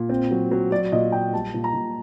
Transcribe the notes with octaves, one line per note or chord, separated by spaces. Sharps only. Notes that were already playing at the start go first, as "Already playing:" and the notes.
Already playing: A#2
C4
F#3
F#3
F#3 D5
A#2 D#5
A#2 G5
G3 A5
A#2
A#5
A#2